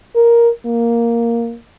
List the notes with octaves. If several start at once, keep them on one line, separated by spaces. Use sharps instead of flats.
A#4
A#3